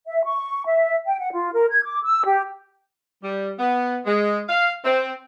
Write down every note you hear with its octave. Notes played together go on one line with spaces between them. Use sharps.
E5
C#6
E5
G5
F#5
F4
A#4
G#6
D6
E6
G4
G3
B3
G#3
F5
C4